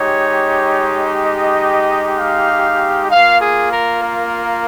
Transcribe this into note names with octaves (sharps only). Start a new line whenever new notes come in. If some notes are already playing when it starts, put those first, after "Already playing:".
Already playing: G#3 D#4 G4 C#5
D#5
F5
A#3 F4 F5
G#4
A#4
A#4